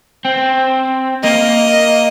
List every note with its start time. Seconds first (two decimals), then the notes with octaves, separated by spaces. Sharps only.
0.25 C4
1.23 A#3 D#5